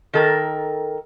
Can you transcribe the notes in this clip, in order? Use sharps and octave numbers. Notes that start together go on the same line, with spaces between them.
D#3 A4 A#4